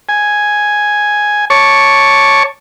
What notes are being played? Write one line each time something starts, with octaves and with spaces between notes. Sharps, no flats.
G#5
C#5 A5 C#6 D6